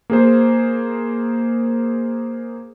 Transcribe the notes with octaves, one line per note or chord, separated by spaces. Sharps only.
A#3 G#4 C5